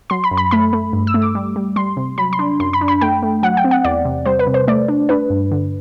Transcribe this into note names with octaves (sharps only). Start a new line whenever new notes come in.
F#3 C6
B5
F#2
B5
A3 B5
A3
G2
E6
A3
D6
G3
G3
G3 C6
C3
F#3 B5
C6
D4
F#2 C6
B5
D4
B5
A3 G5
A3
F#3 F#5
G5
C4
F#5
E2 D5
C3
G3 C5
B4
C3
C5
A3 D5
D4
D4 B4
G2
D3